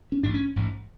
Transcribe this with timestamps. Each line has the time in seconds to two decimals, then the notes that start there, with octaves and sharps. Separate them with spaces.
0.12 C#4
0.23 A1 G#2 D4
0.34 C#4
0.56 A1 G#2